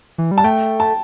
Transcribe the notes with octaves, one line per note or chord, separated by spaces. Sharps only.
E3
G3
A5
A3 G5
A5